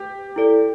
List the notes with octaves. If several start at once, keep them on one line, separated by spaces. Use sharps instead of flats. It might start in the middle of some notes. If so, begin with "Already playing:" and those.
Already playing: G4
E4 A4 D5